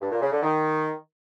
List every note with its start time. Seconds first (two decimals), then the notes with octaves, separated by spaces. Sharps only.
0.01 G2
0.12 A#2
0.22 C#3
0.32 D3
0.42 D#3